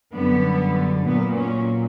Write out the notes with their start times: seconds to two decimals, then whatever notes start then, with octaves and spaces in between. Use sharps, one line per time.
0.13 F#2 D3 G3 B3
1.05 A#2 F#3 A#3 B3
1.36 C#4